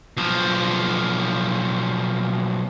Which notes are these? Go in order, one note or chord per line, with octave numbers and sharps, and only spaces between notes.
B1 F3